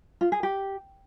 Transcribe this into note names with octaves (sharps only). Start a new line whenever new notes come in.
F4
G#4
G4